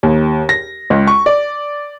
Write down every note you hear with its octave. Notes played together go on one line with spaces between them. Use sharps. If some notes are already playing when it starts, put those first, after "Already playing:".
D#2
A#6
C#2
C#6
D5